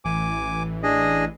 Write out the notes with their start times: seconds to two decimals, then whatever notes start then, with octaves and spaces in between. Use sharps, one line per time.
0.05 A1 E3 G#5 D6
0.83 D4 G#4 D#5